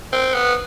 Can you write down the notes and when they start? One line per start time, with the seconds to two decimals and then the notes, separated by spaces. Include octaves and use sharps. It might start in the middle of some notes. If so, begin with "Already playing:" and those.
0.13 C4
0.34 B3